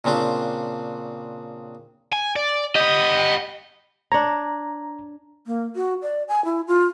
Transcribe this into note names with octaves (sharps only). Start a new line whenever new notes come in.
A#2 C#3 C4 D4 G4
G#5
D5
B3 G4 D#5
D4 C#5 A#5
A#3
F#4
D5
G#5
E4
F4